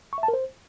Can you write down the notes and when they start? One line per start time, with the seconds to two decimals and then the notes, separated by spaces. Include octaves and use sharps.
0.13 C#6
0.18 E5
0.23 A5
0.28 A#4
0.33 C5